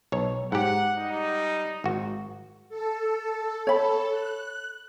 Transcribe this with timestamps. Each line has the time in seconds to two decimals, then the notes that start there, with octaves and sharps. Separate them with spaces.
0.12 B1 C#5
0.52 G#2 G4 F#5
0.98 G3 D#4
1.84 G#1 F#4
2.69 A4
3.67 A4 C#5 B5
4.11 F#6